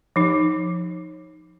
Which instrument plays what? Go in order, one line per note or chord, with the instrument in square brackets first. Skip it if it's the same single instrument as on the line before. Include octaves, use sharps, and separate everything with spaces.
[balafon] F3 D#4